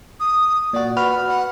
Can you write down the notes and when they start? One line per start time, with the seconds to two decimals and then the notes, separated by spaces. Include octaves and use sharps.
0.20 D#6
0.73 A#2 F#4 D5
0.97 F#4 B4 B5 F6
1.28 F#5